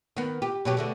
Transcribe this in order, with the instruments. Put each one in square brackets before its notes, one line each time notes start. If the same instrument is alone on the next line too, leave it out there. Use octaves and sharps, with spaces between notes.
[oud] D#3 B3
G4
B2 F#3 G4
B2 D3 A3